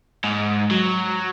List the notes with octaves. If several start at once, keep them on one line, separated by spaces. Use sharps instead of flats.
G#2
F#3